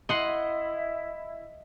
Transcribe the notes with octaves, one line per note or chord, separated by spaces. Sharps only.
E4 D#5 E5 F#5 C6